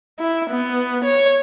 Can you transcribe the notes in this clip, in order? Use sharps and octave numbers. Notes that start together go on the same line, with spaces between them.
E4
B3
C#5